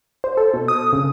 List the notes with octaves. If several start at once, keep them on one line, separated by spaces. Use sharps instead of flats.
C5
A4
B2
D#6
C#3